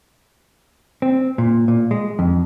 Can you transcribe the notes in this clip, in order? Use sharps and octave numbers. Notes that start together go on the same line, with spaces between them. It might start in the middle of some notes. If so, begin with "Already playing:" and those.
C4
A#2
A#2
G#3
F2